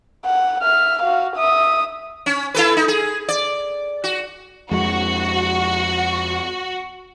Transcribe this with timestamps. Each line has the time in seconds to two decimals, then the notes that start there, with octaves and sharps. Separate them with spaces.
0.25 F#5
0.63 E5 F6
1.02 F#4 F5
1.36 E5 D#6
2.26 C#4
2.54 E4 A4 B4
2.77 D#4
2.88 G#4
3.29 D5
4.04 F#4
4.71 F2 G#3 F#4